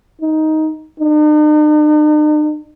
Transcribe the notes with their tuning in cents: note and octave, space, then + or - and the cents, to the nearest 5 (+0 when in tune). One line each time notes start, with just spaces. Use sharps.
D#4 +10
D#4 -45